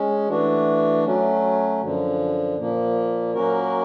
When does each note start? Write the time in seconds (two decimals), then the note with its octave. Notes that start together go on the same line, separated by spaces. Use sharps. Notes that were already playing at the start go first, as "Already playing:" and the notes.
Already playing: G#3 C#4
0.28 E3 A3 D4 F#4
1.04 F#3 A3 C#4
1.81 F#2 D3 F3
2.57 A#2 F3 A#3
3.34 F#3 A#3 C#4 F#4 A#4